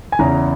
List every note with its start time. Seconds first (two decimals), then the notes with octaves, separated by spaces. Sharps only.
0.12 G#5
0.19 E2 C#3 E3 A#5